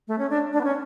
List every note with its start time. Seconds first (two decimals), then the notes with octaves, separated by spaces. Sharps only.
0.08 A3
0.19 C#4
0.30 D4
0.53 D4
0.61 B3
0.64 C#4